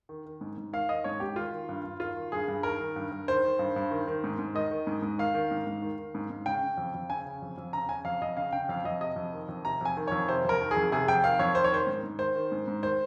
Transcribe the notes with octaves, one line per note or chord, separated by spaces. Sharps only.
D#3
D#3
G#2
G#2
D#3 F5
D#3 D#5
G#2 C#5
G#2 G4
D#3 F4
D#3
G2
G2
D#3 F4
D#3
G2 G#4
G2
D#3 A#4
D#3
G2
G2
D#3 C5
D#3
G2
G2
D#3
D#3
G#2
G#2
D#3 D#5
D#3
G#2
G#2
D#3 F5
D#3
G#2
G#2
D#3
D#3
G#2
G#2
C#3 G5
C#3
F2
F2
C#3 G#5
C#3
F2
F2
C#3 A#5
C#3 G#5
F2 F5
F2 D#5
C#3 F5
C#3 G5
F2 F5
F2 D#5
C3 D#5
F2
D#3
F2
C3 A#5
F2 G#5
D#3
F2 C#5
C3 C5
F2 A#4
D#3
G#4
F2
C3 G#4
F2 G5
D#3 F5
F2 C#5
D#3 C5
C#5
D#3 C5
G#2
G#2
D#3 C5
D#3
G#2
G#2
D#3 C5